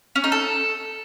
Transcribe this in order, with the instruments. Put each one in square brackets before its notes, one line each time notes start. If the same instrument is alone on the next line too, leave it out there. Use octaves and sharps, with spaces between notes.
[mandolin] C#4
D#4
A4